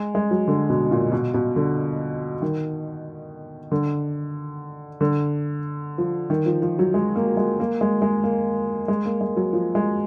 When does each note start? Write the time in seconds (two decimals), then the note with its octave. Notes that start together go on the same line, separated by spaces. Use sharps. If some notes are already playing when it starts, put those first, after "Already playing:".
Already playing: G#3
0.15 G#3
0.31 F#3
0.48 D3
0.69 B2
0.91 A#2
1.12 B2
1.34 B2
1.56 D3
2.42 D#3
3.72 D3
5.01 D3
5.98 F3
6.30 D#3
6.46 F3
6.62 F3
6.79 F#3
6.94 G#3
7.16 A#3
7.37 G#3
7.60 A#3
7.81 G#3
8.02 G#3
8.24 A#3
8.88 G#3
9.05 A#3
9.21 G#3
9.37 F#3
9.53 F3
9.75 G#3